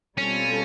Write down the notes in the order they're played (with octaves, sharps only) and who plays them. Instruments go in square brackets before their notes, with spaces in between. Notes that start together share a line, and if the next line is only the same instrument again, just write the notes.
[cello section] B2 G3 C4 F4 A4 [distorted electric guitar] C#4